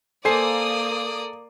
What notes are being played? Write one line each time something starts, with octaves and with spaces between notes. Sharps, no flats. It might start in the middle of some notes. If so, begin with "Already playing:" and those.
A#3 A4 C5 D5 G#5 D#6 C7